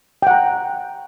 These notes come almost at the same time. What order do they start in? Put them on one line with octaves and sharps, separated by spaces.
G5 F#5 A#5